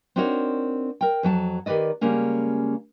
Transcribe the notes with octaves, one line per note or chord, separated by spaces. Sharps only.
C4 D4 D#4 F#4 A#4 C#5
A#4 G5
F2 F#3 G5 A5
D#3 G4 B4 D5 D#5
C#3 G3 G#3 A#3 C#4